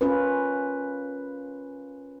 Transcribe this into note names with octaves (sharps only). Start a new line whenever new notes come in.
C#4 F4 A#4 B4